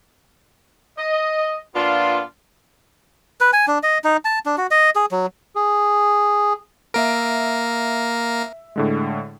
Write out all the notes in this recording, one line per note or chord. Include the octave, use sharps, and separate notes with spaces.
D#5
A#2 B3 D4 F4
B4
G#5
D4
D#5
D#4
A5
D4
F#4
D#5
G#4
F#3
G#4
A#3 A#4 E5 D7
A2 D3 G#3